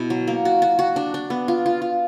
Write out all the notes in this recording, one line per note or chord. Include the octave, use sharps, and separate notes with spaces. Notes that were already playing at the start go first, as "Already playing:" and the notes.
Already playing: B2 B3 E4
F#3
A#3
F#4
F#4
F#4
D4
D4
B3
F4
F4
F4